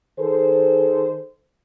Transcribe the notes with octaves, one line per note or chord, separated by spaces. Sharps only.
D#3 G#4 A4 C5